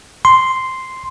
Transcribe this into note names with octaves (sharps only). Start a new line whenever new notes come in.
C6